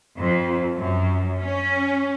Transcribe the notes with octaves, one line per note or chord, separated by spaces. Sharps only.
F2
F#2
C#4